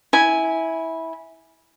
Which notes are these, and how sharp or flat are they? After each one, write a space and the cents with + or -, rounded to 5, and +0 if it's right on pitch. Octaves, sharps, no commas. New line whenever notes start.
E4 -15 G#5 +0